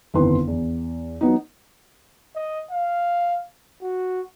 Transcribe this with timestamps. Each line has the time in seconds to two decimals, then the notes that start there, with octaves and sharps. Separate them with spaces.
0.14 G1 F2 D#3 E4 B4 C6
0.47 E2
1.21 F#3 B3 D#4
2.36 D#5
2.71 F5
3.82 F#4